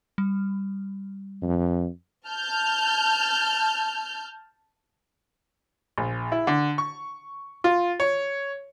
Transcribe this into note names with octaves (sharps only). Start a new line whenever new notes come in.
G3
F2
A5 F6 G6
A#1
E4
D3
C#6
F4
C#5